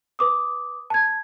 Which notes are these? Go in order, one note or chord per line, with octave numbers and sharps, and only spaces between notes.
B4 D6 D#6
A5 G#6